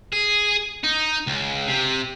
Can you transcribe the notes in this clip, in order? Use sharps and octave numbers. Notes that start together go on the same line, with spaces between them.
G#4
D#4
C#2
C3